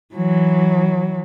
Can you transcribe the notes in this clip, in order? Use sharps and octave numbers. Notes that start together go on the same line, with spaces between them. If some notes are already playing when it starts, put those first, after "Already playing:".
E3 F#3